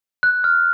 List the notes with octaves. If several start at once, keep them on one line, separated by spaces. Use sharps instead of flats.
F#6
F6